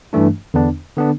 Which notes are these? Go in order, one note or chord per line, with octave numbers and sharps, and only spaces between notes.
G2 E3 A3 D4
E2 D3 B3 D4
D3 B3 D4